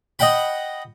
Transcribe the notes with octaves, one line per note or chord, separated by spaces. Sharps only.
D#5 F#5 G5 B5